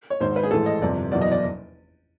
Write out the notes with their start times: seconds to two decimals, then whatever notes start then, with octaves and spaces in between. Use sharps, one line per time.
0.10 C#5
0.20 G#1 G#2 D#3 C5
0.36 B4
0.43 G#4
0.51 A1 G#2 E3 A4
0.66 D#5
0.82 G1 F2 C3 D5
1.11 F#1 E2 B2 F#3 D5
1.22 D#5
1.32 D5